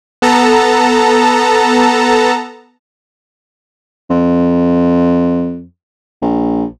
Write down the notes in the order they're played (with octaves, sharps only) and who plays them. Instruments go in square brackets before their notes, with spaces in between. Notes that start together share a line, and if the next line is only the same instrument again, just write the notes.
[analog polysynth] B3 A4 A5 A#5
[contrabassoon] F2
A#1